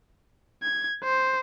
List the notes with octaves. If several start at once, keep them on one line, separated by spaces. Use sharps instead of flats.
G#6
C5